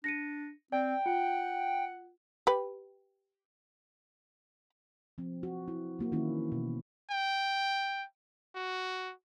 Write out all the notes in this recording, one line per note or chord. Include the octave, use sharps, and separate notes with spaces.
D4 A#6 C#7 D#7
C4 D5 G5
F4 F#5
G4 B4
F3 C4
F#4
E4
F#3 A#3 F#4
D#3 E3 A#3 C#4 E4
B2
G5
F#4